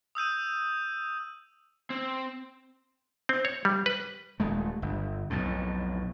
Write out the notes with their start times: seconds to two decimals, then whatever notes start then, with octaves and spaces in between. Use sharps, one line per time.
0.15 D#6 E6 G6 D#7
1.90 C4
3.29 C4
3.45 C#5
3.65 G3
3.86 B4
4.40 D#1 G#3 A3
4.82 G1
5.30 B1 F2 A2